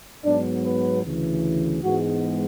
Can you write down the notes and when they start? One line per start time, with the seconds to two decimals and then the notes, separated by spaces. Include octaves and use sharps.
0.23 G#2 F#3 B3 D4
0.63 B4
1.03 D2 C#3 E3
1.82 G#2 E3 G#3 B3 F#4